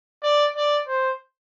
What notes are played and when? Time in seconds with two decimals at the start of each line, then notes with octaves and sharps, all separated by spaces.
0.23 D5
0.56 D5
0.87 C5